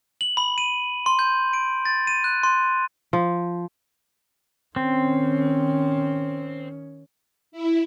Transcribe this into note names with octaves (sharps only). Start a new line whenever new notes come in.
F#7
B5
D#7
C6
G6
D7
A6
D#7
F#6
C6
F3
D#3 C4 C#4
E4